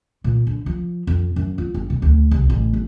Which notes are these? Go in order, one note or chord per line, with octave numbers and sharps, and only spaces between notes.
A#2
D3
F3
F2
F#2
F4
G1
B2
D2
C2
A1
G1